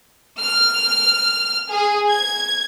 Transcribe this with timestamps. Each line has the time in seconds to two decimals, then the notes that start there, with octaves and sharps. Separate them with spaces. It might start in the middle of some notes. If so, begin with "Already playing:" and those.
0.40 F6
1.70 G#4
2.10 G#6